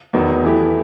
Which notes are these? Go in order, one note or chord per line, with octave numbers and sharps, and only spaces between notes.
E2 D#3 F#3 B3
E3 A3 E4 G4